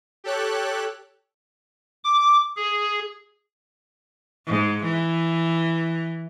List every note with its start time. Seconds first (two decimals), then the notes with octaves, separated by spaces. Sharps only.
0.24 G4 A4 C#5 F#6
2.04 D6
2.57 G#4
4.47 G#2
4.84 E3